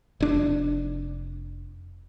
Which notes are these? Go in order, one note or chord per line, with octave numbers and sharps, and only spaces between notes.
F1 D4